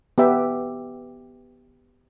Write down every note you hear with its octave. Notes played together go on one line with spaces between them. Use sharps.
B3 G4 E5 G5